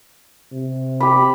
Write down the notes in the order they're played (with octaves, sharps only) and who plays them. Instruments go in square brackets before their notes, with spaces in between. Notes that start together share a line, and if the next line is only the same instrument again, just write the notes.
[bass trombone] C3
[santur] G4 B5